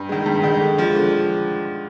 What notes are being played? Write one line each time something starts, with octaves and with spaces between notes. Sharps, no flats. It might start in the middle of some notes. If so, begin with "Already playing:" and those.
Already playing: G2
D#3 G#3
G2
D#3 G#3
D3
F3 G#3
D3